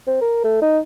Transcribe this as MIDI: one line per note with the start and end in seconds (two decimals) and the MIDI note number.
0.07 0.18 60
0.21 0.44 70
0.44 0.57 57
0.62 0.79 63